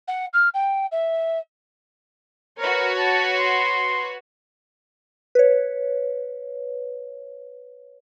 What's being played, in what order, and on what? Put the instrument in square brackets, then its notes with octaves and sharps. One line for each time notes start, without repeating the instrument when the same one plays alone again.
[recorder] F#5
F6
G5
E5
[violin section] F#4 B4 C#5 [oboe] A#4
[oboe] A5
C6
[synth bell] B4 C#5